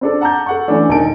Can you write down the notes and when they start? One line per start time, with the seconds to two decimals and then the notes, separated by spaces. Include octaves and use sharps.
0.01 C4 D4 A4
0.21 F#5 A5 A#5 D6 G6
0.46 A4 F#5 C#6
0.68 E3 A3 C#4 D4
0.88 E1 D#3 G#5 A5 D7